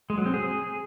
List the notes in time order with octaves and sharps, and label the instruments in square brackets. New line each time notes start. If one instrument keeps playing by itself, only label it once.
[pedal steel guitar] G#3
F#3
C4
G#4